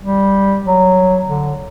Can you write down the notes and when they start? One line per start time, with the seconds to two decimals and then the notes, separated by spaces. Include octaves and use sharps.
0.02 G3
0.64 F#3
1.27 D3